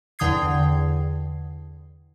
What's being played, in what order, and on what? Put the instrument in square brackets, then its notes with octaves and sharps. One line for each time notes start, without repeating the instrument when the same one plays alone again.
[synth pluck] E2 D3 G5 D#6 G#6 C7